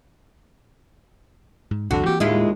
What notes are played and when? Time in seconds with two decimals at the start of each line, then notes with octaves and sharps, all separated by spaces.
1.71 G#2
1.91 C2 F2 A2 D3 F#4
2.06 E3 A#3 C4 G4
2.20 D#2 A2 G#3 E4 F4